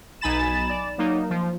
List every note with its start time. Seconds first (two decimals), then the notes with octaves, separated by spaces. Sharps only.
0.21 B1 D#4 G#5 B5 A6 E7
0.69 D5
0.98 F#3 A#3 D#4
1.30 F3